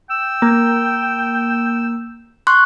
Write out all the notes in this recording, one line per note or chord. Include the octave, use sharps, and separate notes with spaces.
G5 E6
A#3
C6 C#6 F#6